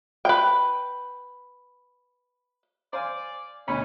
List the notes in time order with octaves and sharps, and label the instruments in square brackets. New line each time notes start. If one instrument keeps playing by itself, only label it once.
[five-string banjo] B4 G5
[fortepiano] C5 F5 G#5 [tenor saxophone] D5
[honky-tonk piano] D2 B2 D3 [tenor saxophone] C#4 [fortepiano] C#5 B5